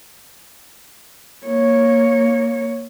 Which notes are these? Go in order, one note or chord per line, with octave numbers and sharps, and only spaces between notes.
A#3 C#5